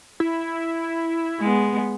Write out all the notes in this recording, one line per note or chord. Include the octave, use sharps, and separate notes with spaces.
E4
G#3 B3